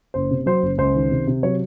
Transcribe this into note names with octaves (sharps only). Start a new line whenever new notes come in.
F#1 C5
C3
F#3 C5
F#1
C#2 C5
D#3
C3
C3
F#3 C#5